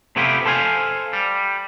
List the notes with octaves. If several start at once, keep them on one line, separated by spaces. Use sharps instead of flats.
C3 A3 B3 E4 F4 G4
A4 C5 F5 G#5
G3